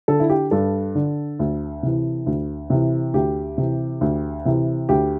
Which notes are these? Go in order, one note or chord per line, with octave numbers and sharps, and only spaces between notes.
D3 A4
E4
G4
G2 A4
D3
D2
C3 E3
D2
C3 E3
D2 G4
C3 E3
D2
C3 E3
D2 G4